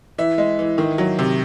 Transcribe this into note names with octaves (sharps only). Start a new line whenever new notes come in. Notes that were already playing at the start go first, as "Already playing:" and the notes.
E3 E5
G#3
E3
D#3
F#3
C3